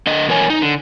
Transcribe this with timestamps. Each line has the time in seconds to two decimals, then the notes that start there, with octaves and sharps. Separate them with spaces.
0.07 D3 D#5
0.28 B2 E3 A#4 C#5 G#5
0.50 D#4
0.62 D3